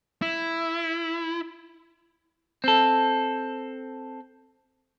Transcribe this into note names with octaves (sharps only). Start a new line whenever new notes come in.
E4
C4 A4